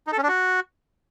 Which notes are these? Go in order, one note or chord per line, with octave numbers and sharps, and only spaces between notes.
D#4
A4
C#4
D4
F#4